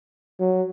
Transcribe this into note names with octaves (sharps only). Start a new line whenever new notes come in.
F#3